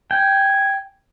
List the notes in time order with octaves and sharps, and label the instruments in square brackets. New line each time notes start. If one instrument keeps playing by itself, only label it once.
[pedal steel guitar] G5 [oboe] G#5